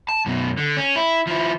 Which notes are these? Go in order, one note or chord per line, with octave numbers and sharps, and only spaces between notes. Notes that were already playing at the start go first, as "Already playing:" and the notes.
A5
F#2 B2
D3
C#4
E4
F3 E4